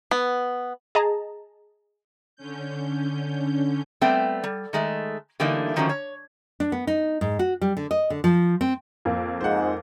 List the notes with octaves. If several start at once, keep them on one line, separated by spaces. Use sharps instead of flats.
B3
G#4 D#5 A5 A#5
D3 C#4 G6
G3 A3 B3 C4 G5
G3
D#3 G#3 A3
D3 E3 G3 A3 A#3 D#4
D3 D#3 F3 F#3 A3 C#4
C#5
D4
B3
D#4
G#2
F#4
G3
D3
D#5
D3
F3
C4
F2 A#3
G#2 C5 F#5